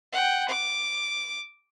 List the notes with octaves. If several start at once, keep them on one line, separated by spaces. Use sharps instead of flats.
F#5 G5
D6